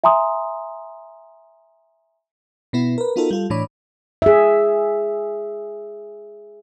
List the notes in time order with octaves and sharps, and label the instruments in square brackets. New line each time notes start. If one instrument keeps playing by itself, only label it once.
[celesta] E5 G#5 A#5 C6 D#6
[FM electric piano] B2 B3 E4
A#4 B4
B3 D#4 F4 F#4 A4 A#4
G3 F4 A4
A2 E3 D4 C#5 B5 D6
[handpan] G#4 E5